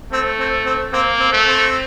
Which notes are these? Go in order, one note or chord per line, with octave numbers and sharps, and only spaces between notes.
A3 C4
C4
C4
A#3 C4
C4
A3
C4